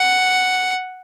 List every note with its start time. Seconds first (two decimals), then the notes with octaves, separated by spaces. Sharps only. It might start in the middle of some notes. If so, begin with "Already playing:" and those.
Already playing: F#5